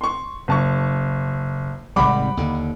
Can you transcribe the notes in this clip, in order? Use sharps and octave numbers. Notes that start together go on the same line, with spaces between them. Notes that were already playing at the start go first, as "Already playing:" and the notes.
C6 C#6
F#1 A5 C#6
G#1 C3 G3 F#5 B5 D6
D#2 D3